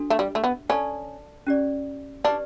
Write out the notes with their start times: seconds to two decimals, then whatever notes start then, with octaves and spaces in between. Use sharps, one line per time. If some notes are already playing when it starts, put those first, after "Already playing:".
Already playing: D4 F#4 A4
0.10 A3
0.19 G3
0.35 A3
0.44 B3
0.69 C#4 A4 D5 A5
1.47 C#4 G4 D5
2.25 D4 G4 B4 D5